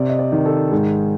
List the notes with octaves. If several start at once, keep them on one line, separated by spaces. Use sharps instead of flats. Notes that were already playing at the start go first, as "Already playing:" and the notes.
Already playing: C3 D5
D#5
D5
D#3
A4
G#2 G#4